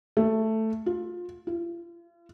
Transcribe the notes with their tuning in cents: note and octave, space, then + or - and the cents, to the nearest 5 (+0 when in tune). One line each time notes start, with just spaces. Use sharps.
A3 +5
F4 +15
F4 -45